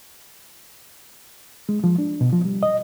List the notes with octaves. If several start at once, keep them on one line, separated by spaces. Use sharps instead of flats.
G#3
F3
D4
B2
F3
G3
D#5